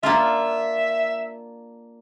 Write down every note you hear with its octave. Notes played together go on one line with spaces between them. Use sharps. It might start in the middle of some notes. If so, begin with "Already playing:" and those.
A#3 D4 F4 E5